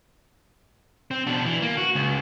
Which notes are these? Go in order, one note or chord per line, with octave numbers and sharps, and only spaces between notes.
C4
B2 D4
E3
A#3
F#4
C#2